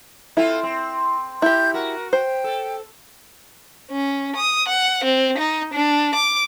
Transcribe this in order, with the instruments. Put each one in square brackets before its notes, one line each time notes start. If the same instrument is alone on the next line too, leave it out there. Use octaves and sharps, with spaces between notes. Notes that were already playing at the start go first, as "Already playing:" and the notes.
[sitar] C4 F4 A4 [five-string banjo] E4
[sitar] C4
[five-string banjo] E4 G4 [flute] G6
[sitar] F#4 [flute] A#4
[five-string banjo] C5 [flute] G5
[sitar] A4
[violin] C#4
D#6
F#5
C4
D#4
D4
D6